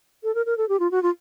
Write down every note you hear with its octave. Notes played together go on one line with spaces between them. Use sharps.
A4
A#4
A#4
A4
G4
F4
F#4
F4